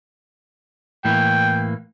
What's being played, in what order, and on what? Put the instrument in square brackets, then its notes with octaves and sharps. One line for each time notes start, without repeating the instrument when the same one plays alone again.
[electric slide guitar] A2 E3 A#3 [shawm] G5